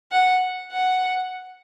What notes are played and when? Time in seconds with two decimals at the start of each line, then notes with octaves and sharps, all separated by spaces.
0.12 F#5
0.72 F#5